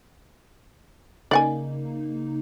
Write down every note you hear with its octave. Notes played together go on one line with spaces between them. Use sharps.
C#3 A#3 D#4 D5 F#5 G#5